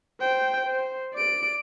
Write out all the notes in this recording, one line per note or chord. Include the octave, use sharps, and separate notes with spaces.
C5 G5
C5
D5 D7